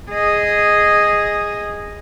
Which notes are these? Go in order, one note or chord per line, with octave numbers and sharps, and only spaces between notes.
G#4 D#5